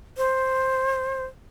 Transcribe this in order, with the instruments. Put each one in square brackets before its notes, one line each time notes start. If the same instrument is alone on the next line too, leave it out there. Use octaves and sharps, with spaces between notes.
[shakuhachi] C5